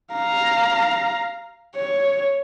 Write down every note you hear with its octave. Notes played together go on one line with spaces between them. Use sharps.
F5 A#5
C#5